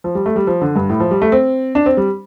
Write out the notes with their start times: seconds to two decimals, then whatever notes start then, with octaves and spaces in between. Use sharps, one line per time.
0.04 F3
0.15 G3
0.26 A3
0.36 G3
0.47 F3
0.62 D3
0.76 G2
0.89 A2
1.00 F3
1.11 G3
1.22 A3
1.32 C4
1.75 D4
1.86 C4
1.97 G3